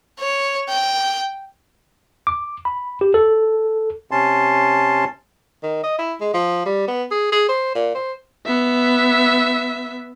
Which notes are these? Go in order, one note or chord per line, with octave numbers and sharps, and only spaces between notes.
C#5
G5
D6
B5
G4
A4
C3 C#4 A5 C6
D#3
D#5
E4
G#3
F3
G3
B3
G#4
G#4
C5
A#2
C5
B3 E5